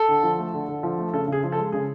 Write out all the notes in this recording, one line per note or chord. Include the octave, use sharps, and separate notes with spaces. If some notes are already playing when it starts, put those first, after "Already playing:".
Already playing: A4
D3
F3
A3
D3
D3
F3
A3
C#3 A4
C#3 G#4
F3
A4
G#3
C#3 G#4